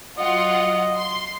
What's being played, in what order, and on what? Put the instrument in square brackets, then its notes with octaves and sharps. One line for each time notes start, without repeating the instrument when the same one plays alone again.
[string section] F#3 F4 F#5 [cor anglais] D#5
[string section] C6